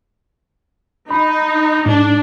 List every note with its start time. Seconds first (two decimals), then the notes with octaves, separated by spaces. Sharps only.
1.11 D#4 B5
1.86 G#2 D4